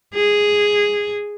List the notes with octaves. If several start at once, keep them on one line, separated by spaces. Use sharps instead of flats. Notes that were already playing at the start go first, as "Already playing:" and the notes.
G#4